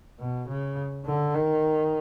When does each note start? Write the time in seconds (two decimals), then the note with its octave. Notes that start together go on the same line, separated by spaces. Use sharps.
0.19 B2
0.48 C#3
1.05 D3
1.34 D#3